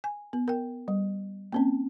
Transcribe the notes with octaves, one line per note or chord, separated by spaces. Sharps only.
G#5
B3
A#4 G5
G3
A#3 C4 C#4